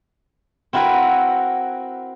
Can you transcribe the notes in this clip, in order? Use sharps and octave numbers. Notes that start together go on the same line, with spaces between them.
C4 E4 F#4 A#4 B4